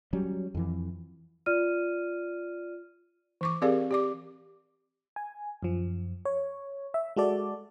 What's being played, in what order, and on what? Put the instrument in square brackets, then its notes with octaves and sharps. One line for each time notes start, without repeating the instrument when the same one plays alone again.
[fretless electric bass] F#3 G3 C#4
F2 E3
[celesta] F4 D5 F6 D#7
[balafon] E3 C#6 D6
C4 G4 G#4 A#4 D5 F5
G4 D5 D6
[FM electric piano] G#5
F#2 F3
C#5
E5
G#3 F#4 A4 D5